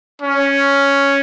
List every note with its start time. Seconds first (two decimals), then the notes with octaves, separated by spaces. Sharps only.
0.22 C#4